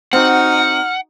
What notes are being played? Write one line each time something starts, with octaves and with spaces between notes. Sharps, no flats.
C4 D#4 F#4 F#5 F6